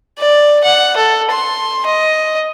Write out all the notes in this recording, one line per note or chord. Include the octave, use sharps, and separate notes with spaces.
D5
F#5
A4
C6
D#5